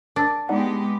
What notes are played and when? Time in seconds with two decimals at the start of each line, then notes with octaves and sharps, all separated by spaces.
0.16 D4 A#4 E6
0.49 G#3 B3 D#4 G4 D5 F#5